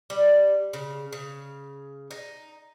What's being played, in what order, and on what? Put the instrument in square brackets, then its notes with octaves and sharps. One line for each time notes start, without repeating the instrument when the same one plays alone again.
[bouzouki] G3
C#3
C#3
D#4